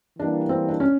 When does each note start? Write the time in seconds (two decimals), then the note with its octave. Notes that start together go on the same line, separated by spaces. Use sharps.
0.19 E3 G3 A#3 D4
0.49 C4
0.68 D4
0.80 C#4